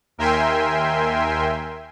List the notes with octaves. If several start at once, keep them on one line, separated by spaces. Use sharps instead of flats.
D#2 A#4 E5 G5 G#5 C6